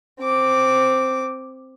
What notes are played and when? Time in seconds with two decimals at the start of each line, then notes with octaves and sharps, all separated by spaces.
0.21 C4 D6